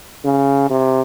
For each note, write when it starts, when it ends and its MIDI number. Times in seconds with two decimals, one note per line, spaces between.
0.24 0.69 49
0.70 1.02 48